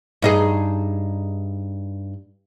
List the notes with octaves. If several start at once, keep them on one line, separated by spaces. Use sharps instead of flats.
G2 D#4 G#4